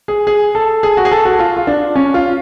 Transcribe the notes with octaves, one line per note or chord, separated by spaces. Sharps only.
G#4
G#4
A4
G#4
F#4
G#4
A4
F#4
F4
F4
D4
C#4
F4